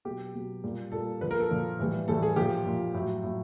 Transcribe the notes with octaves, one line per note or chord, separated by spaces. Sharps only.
B2 F#3 G4
B2 F#3
A#2 G3
A#2 G3 A4
A#2 F3 B4
A#4
A4
A#2 F3
A2 E3 G3
A2 E3 G3 A4
G#4
A#2 F3 G4
A#2 F3
A2 F#3
A2 F#3